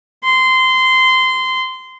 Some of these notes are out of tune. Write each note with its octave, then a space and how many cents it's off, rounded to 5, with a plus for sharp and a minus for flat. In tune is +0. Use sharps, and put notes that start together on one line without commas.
C6 -15